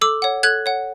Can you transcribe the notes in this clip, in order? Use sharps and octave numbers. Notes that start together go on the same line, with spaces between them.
A4 D6 E6
C#5 F#5
A4 F#6 G#6
C#5 F#5